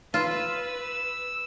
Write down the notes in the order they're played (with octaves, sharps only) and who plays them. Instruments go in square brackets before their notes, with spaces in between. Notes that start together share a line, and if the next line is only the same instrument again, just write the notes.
[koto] F4 [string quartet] B4 [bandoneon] E6